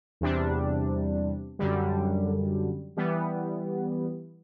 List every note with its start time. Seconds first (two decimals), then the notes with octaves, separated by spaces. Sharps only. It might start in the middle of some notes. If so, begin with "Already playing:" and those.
0.21 E2 C3 G3 D4
1.59 F#2 D3 G3
2.97 E3 G3 B3